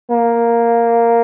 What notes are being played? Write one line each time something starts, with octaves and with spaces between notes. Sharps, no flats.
A#3